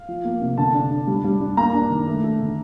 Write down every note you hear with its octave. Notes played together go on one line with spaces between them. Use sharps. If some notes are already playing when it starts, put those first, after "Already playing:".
Already playing: F5
F3
A#3
C3
D3 A5
D4
D4
G3
G3
D4
A#3 A#5
D4
D#3
A3
A3
D3